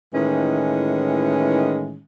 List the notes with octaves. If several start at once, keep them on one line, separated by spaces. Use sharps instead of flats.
A2 D#3 E3 G#3 C#4